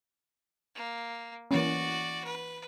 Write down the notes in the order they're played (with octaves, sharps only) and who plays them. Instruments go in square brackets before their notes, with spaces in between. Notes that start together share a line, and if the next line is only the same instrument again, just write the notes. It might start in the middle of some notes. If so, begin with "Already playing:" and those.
[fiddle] A#3
[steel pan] E3 A#3 C#4 [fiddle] F#4 D5
[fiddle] B4